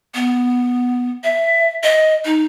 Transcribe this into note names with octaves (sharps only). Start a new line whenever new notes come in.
B3
E5
D#5
D#4